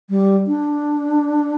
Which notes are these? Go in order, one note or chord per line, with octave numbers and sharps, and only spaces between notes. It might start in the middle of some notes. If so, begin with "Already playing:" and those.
G3
D4